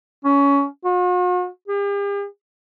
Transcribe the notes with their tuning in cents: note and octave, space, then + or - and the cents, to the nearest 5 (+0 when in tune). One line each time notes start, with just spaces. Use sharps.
C#4 +20
F#4 -45
G4 +45